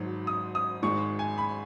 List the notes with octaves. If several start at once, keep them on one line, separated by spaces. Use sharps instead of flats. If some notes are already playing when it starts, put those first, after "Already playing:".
Already playing: G#1 G#2 F#3
D#6
D#6
G#1 G#2 G#3 C#6
G#5
B5